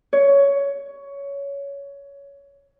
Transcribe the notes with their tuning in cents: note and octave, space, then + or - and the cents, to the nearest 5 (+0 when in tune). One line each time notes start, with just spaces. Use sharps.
C#5 +15